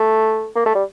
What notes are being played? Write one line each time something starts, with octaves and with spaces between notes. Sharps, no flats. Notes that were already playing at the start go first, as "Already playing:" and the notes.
Already playing: A3
A#3
A3
G3